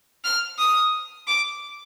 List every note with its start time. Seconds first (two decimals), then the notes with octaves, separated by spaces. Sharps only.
0.24 F6
0.58 D#6
1.28 D6